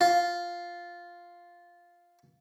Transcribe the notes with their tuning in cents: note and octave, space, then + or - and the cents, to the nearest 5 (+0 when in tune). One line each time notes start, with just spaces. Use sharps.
F4 +0